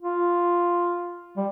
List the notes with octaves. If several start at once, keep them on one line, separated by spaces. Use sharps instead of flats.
F4
G3